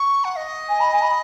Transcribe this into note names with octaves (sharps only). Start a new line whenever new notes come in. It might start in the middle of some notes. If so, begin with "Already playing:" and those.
Already playing: C#6
F#5
D#5
G#5
B5
G#5
B5